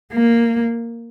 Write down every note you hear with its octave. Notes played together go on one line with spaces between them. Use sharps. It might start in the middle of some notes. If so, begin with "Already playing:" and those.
A#3